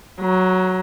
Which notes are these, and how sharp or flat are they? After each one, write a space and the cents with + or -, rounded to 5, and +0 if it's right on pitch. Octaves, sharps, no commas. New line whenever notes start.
F#3 +0 A#5 +25